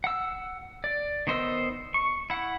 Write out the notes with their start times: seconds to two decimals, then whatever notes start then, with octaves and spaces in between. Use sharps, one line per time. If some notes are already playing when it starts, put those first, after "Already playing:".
0.04 F#5 E6
0.84 D5
1.27 D#3 B3 C5 D#5 E6
1.94 C#6
2.30 E4 F#5